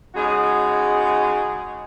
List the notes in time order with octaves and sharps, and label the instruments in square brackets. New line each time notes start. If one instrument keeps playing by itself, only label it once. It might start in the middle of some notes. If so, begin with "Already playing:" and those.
[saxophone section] C#3 G#3 D#4 F#4 G#4